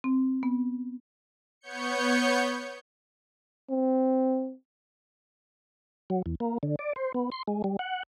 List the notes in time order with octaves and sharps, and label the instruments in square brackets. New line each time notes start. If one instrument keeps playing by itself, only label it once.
[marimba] C4
B3
[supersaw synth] B3 C#5 G6 C#7
[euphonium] C4
[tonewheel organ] F#3
E2
A#3
D3
D5
C5
B3
C6
G#3
G3
F#5